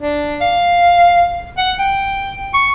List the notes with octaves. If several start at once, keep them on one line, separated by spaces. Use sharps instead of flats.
D4
F5
F#5
G5
C#6